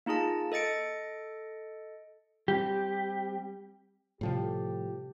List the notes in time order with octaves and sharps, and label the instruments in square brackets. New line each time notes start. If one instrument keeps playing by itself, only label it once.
[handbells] A#3 D#4 F4 G#4 A5
A4 D#5 A6 C#7 D7
[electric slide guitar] G3 C4 [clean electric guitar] G4
[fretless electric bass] A2 F3 G3 [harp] C3 A4 C7 [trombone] G4